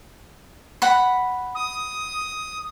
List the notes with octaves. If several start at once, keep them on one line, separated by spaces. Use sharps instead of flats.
F#5 B5
D#6